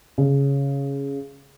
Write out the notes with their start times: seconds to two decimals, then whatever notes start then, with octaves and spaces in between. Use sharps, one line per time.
0.18 C#3